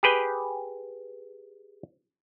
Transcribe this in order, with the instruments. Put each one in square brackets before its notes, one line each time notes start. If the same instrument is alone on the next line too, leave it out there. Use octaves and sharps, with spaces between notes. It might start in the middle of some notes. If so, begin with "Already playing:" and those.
[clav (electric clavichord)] G4 G#4 B4 G5